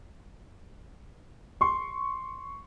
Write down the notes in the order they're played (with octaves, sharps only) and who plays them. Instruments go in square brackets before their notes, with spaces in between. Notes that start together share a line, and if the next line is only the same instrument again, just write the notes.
[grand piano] C6 C#6